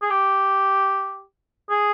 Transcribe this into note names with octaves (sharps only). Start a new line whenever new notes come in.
G#4
G4
G#4